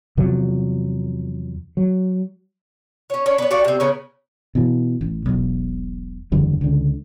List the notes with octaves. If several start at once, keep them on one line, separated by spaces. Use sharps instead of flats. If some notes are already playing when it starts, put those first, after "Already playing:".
E2 C3 F3 F#3
F#3
C#4 C#5
C#4 D4
B3 C#5
F#4 A4 D5 F5
C3 C4
C#3 B3 C#4 A#4
B2 E3
A1
E1 B1
F#1 E2 D3 G3
C#2 D3